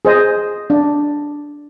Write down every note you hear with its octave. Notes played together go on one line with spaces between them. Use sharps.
G#4 C5 D#5
D4